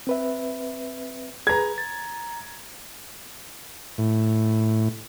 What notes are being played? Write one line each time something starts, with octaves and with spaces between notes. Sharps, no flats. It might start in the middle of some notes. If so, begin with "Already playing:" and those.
C4 B4 E5
G#4 B4 A#5 G#6
A6
A2